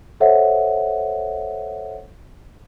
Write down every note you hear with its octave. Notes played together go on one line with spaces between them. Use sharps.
A4 C5 C#5 D#5 E5 F#5